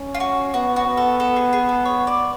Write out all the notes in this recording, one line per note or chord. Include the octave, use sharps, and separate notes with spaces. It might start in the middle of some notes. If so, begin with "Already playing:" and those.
Already playing: C#4
F4
F#4
B3 F#4
F#4
B3
A4
A4
G#4
G#4
A4
C#5
D5